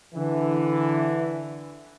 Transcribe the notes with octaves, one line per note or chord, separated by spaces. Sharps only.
D3 E3